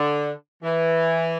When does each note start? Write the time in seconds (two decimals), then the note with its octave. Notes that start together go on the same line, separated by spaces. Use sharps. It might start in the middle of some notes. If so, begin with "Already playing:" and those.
Already playing: D3
0.63 E3